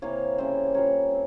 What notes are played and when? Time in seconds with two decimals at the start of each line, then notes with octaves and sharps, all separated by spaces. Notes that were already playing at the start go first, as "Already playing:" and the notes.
0.02 C3 E3 A#3 C#5 F5
0.38 C#3 G3 C#4 C5 E5
0.74 A#2 G3 A#3 C#4 A#4 C#5
1.11 C4